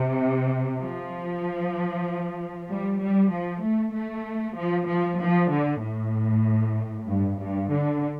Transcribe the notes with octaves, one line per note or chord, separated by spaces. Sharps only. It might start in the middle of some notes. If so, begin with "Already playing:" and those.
Already playing: C3
F3
G3
G3
F3
A3
A3
F3
F3
F3
D3
A2
G2
G2
D3